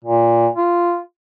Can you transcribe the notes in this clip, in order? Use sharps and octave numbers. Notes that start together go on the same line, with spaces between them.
A#2
F4